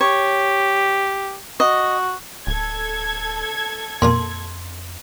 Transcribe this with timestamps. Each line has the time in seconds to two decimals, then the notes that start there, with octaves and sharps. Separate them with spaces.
0.01 G4 C#5
1.60 F#4 D#5
2.47 D1 A4 G#6
4.02 F2 A#2 D4 F4 C6